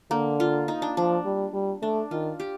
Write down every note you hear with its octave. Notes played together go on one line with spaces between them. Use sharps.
D3 A#3
F4
D#4
D4
F3 D4
G3
G3
A3 D4
D#3 F4
G4